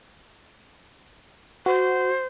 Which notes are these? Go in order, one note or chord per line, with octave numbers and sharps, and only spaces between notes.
F#4 C5